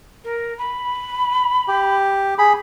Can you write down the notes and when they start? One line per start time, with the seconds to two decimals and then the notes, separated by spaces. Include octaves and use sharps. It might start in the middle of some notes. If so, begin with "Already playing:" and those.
0.24 A#4
0.58 B5
1.68 G4
2.38 G#4 B5